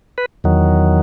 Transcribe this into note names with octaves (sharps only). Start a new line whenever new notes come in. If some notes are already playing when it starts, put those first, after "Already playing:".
B4
E2 D#3 F#3